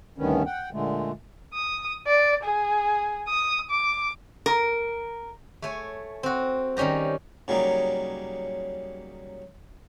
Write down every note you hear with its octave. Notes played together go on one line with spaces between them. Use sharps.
D2 G2 D#3 B3 C#4
F#5 G5
A#2 D3 G#3 A3
D#6
D5
G#4
D#6
D6
A#4
A3 C#5 G#5
C4 F#4
D#3 G3 C#4 G4 A#5
C#3 F#3 G3 A#3 D#4